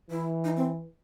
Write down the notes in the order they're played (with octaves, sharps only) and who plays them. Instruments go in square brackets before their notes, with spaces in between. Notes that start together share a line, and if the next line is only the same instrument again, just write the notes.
[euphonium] E3 [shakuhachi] E4
[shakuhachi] D#4
C4